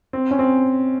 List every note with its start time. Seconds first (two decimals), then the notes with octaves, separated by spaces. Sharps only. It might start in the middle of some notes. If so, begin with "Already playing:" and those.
0.13 C4
0.31 C#4
0.39 C4